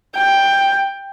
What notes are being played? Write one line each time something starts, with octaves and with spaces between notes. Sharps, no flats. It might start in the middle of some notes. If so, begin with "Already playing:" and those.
G5